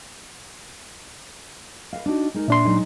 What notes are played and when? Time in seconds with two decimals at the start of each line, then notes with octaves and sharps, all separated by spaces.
1.93 B4 D#5 F5
2.06 D4 D#4 F#4
2.34 G#3 D#4 A#4
2.48 A#2 D4 E5 C6
2.65 F#3 G#3 D#4